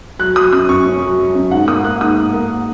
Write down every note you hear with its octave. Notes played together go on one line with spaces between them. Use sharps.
F#3 F#6
F#3 D#6
F#2 D#6
F#2 C#6
C#4
F#3
F#3
F#2
G#2 F#5
A#3 D#6
A#3 F#6
G#2 D#6
A#3
A#3